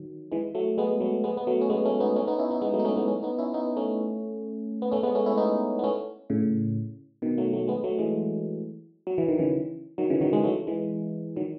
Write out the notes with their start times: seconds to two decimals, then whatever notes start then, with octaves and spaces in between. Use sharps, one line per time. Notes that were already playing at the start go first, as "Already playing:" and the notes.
Already playing: D#3 F#3
0.32 E3 G#3
0.55 F#3 A3
0.78 G#3 B3
1.00 F#3 A3
1.24 G#3 B3
1.37 B3
1.47 F#3 A3
1.61 C#4
1.70 G#3 B3
1.85 A3 C#4
2.00 B3 D#4
2.16 A3 C#4
2.27 B3 D#4
2.38 C#4 E4
2.51 B3 D#4
2.62 G#3 B3
2.73 F#3 A3
2.79 D#4
2.85 A3 C#4
2.96 G#3 B3
3.08 A3 C#4
3.23 B3 D#4
3.38 C#4 E4
3.54 B3 D#4
3.77 A3 C#4
4.82 B3
4.92 A3 C#4
5.03 G#3 B3
5.15 A3 C#4
5.26 C#4 E4
5.38 B3 D#4
5.79 B3
5.84 A3 C#4
6.30 A2 C#3
7.22 B2 D#3
7.38 F#3 A3
7.53 F#3 A3
7.68 G#3 B3
7.84 F#3 A3
7.98 E3 G#3
9.07 F#3
9.18 E3
9.28 D#3
9.39 C#3 E3
9.98 D#3 F#3
10.10 C#3 E3
10.21 D#3 F#3
10.33 E3 G#3
10.44 F#3 A3
10.67 E3 G#3
11.36 D#3 F#3